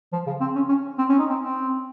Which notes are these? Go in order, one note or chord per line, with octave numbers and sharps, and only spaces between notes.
F3
C#3
C4
C#4
C#4
C4
C#4
D#4
C4
C4